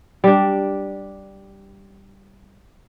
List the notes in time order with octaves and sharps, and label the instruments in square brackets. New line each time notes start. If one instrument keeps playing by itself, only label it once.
[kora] G3 D4